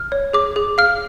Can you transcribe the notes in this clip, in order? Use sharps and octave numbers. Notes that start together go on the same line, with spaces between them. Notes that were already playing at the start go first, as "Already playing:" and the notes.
Already playing: F6
C#5
G#4 D6
G#4
F5 F6